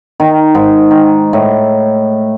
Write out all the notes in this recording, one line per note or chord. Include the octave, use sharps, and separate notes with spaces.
D#3
G#2
D#3
A2